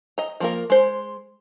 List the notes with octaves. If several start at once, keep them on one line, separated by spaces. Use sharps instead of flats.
D#5 A#5
F3 A#3 A#4
G#3 C5